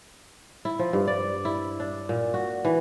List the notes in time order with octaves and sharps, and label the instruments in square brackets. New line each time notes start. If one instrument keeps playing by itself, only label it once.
[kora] E4
F3
G2
D5
E4
D4
A#2
F#4
E3